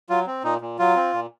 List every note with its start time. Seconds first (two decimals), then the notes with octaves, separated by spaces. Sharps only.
0.09 F#3 F4
0.27 C4
0.44 A#2 D#4
0.61 A#2
0.79 F#3 F4
0.96 C4
1.14 A#2